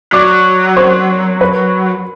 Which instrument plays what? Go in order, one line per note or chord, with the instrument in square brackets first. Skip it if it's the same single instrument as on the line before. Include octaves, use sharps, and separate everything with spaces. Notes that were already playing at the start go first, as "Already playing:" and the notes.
[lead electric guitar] F#3 [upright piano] D5 D6
[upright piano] C5 C6
B4 B5